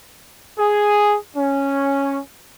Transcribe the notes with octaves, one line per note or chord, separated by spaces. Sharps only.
G#4
C#4